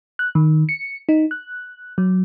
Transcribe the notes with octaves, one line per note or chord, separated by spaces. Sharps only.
F#6
D#3
C#7
D#4
F#6
F#3